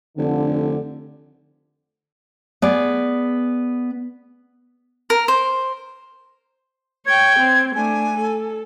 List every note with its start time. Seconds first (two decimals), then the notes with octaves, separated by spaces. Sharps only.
0.18 F1 D3
2.62 B3 G#4 D5
5.10 A#4
5.28 C5
7.06 C#5 G5 G#6
7.39 C4
7.75 A3 D4 G#5
8.17 A4